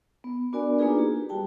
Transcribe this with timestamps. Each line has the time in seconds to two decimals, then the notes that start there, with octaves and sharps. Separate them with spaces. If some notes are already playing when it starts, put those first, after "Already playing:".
0.24 B3
0.53 B3 D4 F#4 A#4 D5 G#5
0.79 A#3 D4 D#4 F4 G#4 B4
0.99 G4
1.29 G3 F#4 G5 A5